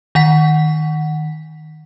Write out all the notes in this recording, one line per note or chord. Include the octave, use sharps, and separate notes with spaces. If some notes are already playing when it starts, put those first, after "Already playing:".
D#3 F#5 B6